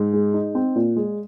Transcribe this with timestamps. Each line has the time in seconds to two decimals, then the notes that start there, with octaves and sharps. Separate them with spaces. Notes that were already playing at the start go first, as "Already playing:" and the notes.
Already playing: G#2
0.13 G#3
0.34 D#4
0.55 C4
0.76 A#2
0.96 G#3